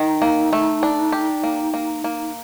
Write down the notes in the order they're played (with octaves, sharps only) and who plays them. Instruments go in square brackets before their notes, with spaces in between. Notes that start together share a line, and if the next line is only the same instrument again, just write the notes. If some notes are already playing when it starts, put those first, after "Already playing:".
Already playing: [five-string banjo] D#3 [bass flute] D#4
[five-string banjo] A#3
A3
D4
G4
A#3
A#3
A#3